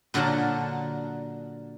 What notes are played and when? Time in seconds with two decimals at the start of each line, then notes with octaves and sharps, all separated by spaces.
0.14 A#2 D3 F#3 A#4 F#5 A5